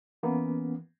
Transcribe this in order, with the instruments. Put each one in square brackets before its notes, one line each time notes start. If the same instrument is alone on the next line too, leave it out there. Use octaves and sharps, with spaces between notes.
[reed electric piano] E3 A#3 B3 C#4